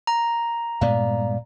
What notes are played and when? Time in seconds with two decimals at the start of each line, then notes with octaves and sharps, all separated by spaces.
0.07 A#5
0.81 G2 A#2 G#3 B3 D5 F5